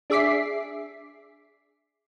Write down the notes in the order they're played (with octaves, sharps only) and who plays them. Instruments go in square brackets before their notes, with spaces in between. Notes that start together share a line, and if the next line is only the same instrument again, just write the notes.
[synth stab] D4 G#4 E5 D6 B6 C7